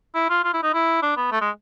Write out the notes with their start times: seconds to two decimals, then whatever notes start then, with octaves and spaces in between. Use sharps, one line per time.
0.15 E4
0.30 F4
0.44 F4
0.53 E4
0.63 D#4
0.74 E4
1.02 D4
1.17 B3
1.32 A3
1.41 G#3